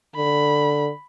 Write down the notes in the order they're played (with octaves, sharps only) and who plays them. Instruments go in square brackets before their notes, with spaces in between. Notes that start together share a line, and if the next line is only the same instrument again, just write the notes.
[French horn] D3 [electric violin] B5